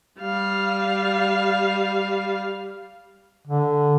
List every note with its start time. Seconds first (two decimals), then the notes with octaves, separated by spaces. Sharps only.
0.20 G3 F5
3.47 D3